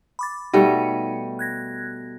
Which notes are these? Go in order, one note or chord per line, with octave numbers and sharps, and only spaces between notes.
B5 D6 A6
B2 G3 A3 D#4 C#7
F#6 G#6 A#6